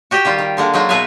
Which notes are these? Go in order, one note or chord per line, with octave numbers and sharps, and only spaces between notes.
F#4 G4 D#5 G5
D#3 G3 F4
D#3
D3 G#3 A#3
F#3 G#3 D#4 F4
B2 D#4 B4 E5 F5 G#5